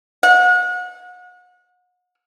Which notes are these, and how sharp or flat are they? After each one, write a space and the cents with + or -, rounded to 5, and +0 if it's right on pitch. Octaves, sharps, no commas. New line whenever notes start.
F#5 -40